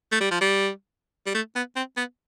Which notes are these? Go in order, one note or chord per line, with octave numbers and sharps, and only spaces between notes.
A3
G3
F3
G3
G3
A3
B3
C4
B3